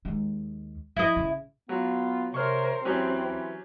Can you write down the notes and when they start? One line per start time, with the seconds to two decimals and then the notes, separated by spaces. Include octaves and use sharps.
0.05 D#2 G#3
0.97 F3 E4 D#5
1.16 C#3
1.69 F#3 B3 F4
2.34 C3 A#4 C5 C#5 C#6 F6
2.85 D#2 E3 F#3 C4 C#4 G4